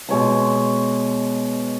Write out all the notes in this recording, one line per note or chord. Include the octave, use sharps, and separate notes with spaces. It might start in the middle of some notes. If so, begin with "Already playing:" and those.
B2 G#3 C#5 C6